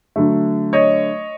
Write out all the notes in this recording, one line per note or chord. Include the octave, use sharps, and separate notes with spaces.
D3 F#3 A3
C#5 D#5